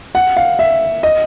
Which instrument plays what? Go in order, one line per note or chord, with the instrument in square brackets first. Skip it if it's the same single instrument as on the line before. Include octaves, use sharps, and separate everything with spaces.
[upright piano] F#5
F5
E5
D#5